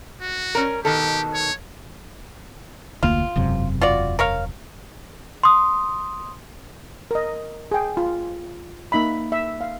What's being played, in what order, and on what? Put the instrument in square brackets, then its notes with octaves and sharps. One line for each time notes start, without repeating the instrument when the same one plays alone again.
[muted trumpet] F#4
[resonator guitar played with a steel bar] C#4 A#4
[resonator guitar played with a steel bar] B2 D#3 A4 [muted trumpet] G4
[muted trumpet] C#5
[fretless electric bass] F1 D2 A#3 [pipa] F4
[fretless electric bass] E1 F#2 C3
[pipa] F4 F#4 D5
A#4 C#5 F5
[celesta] C6 D#6
[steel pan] A#4 D#5
G#4 G5
F4
A#3 D#4 E5 B5
E5
F5